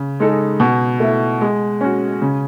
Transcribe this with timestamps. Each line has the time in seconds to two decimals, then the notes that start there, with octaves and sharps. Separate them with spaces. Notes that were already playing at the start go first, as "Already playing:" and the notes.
Already playing: C#3
0.20 G#3 D#4 A4
0.60 B2
1.00 A3 E4
1.41 G#3
1.81 C#4 F#4
2.22 C#3